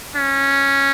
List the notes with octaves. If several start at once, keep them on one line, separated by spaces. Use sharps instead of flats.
C#4